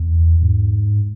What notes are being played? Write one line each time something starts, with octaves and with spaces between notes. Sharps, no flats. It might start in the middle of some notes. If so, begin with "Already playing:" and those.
Already playing: E2
G#2